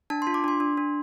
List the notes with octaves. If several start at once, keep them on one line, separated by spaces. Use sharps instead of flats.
D4 A5
F4 C6
D6
D4 C6
D4
D4